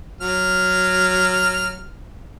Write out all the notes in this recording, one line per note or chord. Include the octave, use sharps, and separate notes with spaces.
F#3 F6